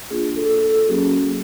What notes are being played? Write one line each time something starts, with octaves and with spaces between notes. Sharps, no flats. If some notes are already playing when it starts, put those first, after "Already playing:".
A#3 D4 F4 G#4
A4
A4
F#3 A#3 C#4 F#4 G#4